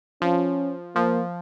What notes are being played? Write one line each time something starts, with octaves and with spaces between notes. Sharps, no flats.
F3 C#4
F3 A#3